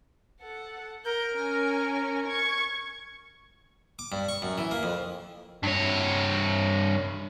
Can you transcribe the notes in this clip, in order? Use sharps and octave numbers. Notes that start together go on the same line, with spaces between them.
A4 F#5
A#4 G6
C#4 G#5
C#6 G#6
D6
G2
C#6
F#2
E3
A#3
F2
G2 C#5